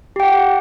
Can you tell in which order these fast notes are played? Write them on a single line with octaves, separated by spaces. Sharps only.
G4 G5 F#5